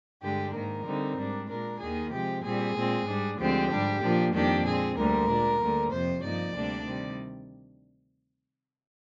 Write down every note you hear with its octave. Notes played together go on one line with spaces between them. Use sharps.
G2 D3 G#3 D4 G4
G#2 D#3 A#3 A#4
D3 G3 C4 D#4
G#2 G3 D4
A#2 G#3 D4 A#4
D#2 D#3 A#3 G#4
C3 F3 G#3 G4
A#2 G3 C4 G#4
A#2 G#3 C4
G#2 G3 D4
D2 D3 F3 G#3 C4 G4
G#2 G3 D4
A#2 F3 A#3 D4
F2 D#3 G3 A#3 D4 G4
A#2 G#3 C4 G#4
D2 D3 G3 A#3 A#4
A#2 G#3 D4
D2 D3 G3 A#3
F2 C3 F3 C5
G2 F3 A#3 D#4 D5
D2 C3 G3 A#3 D4
C3 D#3 G3